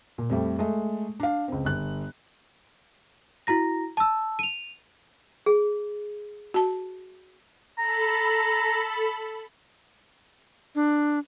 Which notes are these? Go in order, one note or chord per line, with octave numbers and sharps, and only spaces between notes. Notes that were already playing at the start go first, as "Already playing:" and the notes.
A#2
F2 G3 A3
G#3 A3
D4 F5
C#2 C4
G1 F#6
E4 F#4 A#5 A#6
A5 E6
D#7 F7
G#4
F#4 A5
A4 A#5 B5
D4